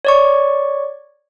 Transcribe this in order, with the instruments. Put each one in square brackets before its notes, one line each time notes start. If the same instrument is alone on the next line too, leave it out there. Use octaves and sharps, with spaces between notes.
[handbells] C#5 D5 C#6